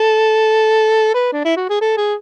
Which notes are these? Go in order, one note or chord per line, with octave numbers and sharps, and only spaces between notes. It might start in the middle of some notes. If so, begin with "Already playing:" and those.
Already playing: A4
B4
D4
E4
F#4
G#4
A4
G#4